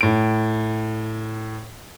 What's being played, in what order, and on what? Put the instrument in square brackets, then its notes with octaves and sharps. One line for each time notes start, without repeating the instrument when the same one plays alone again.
[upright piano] A2 D7